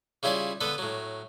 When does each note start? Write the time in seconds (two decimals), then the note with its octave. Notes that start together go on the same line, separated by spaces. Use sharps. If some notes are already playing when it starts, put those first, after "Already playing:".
0.23 C#3 G3 E4 F4 C#5 D5
0.61 D3 B3 A4 B4
0.78 A2 F#3